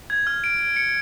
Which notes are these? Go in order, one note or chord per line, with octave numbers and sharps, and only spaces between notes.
G#6
F6
D7
D7
C#7